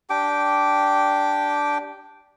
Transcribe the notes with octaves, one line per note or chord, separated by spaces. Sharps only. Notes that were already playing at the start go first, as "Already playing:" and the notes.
D4 G4 G5 D6